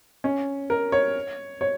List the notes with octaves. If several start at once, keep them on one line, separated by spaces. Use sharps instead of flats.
C#4
A#4
C#5
C#5